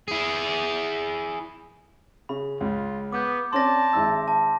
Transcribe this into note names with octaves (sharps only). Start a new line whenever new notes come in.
E4 G#4
C#3 B5
C#2 F4
B3 D6 G6
C4 C#4 D5 A5 C6 A#6
G#1 E4 E6
A5